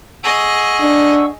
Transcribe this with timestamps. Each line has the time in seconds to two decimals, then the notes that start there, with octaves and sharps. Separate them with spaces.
0.24 G#4 D#5 F#5 C#6 E6
0.81 D4